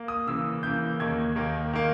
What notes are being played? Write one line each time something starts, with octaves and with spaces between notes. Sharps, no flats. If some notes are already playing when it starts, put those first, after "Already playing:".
Already playing: A#3
D#6
C#3 E3 A#3 E6
C#3 E3 A#3 G6
D#2 D#3 A#3 G#6
D#2 D#3 A#3
D#3 A#3